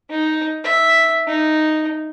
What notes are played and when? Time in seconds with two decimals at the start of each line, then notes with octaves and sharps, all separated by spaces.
0.10 D#4
0.64 E5
1.27 D#4